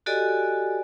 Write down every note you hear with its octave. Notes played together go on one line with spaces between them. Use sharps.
F#4 G4 A4 D5 D#5 G#5